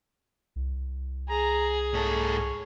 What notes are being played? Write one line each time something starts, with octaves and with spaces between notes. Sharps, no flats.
C2
G#4 A#5
G#2 A4 C#5